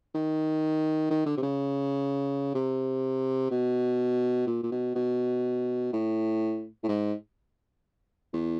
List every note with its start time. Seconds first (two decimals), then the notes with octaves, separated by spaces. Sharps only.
0.15 D#3
1.10 D#3
1.26 D3
1.37 C3
1.43 C#3
2.55 C3
3.51 B2
4.47 A#2
4.63 A#2
4.71 B2
4.95 B2
5.93 A2
6.83 A2
6.88 G#2
8.33 E2